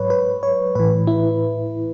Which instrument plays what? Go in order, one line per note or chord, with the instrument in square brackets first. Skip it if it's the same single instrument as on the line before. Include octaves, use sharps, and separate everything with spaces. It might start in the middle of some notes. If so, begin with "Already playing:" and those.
Already playing: [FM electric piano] G#2 F#3 B4 C#5
B4
C#5
A2 E3 B4
E4